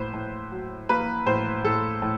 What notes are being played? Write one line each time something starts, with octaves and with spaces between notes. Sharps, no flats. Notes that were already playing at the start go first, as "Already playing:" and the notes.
Already playing: A2 A#3 B4 C5
A2
F#3
A#3 B4
A2 C5
A2 A4
A2